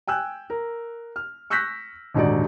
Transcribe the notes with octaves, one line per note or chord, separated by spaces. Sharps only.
G5 G#5 E6 F#6
A#4
F6
C#6 E6 F#6 G6 A#6 B6
D#1 G#2 D3 D#4 F#4 D5